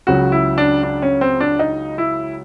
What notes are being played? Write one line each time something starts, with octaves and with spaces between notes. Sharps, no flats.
C#2 C#3 F#3 F#4
E4
D4
D4
C#4
C4
D4
D#4
E4